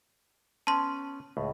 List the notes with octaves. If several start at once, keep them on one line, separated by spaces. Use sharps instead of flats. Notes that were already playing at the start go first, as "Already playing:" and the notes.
B3 C#4 A5 C6
C#2 A2